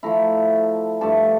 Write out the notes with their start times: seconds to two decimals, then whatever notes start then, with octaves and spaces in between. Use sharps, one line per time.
0.03 F3 A3 E4 A#5
1.01 G2 F3 A3 A5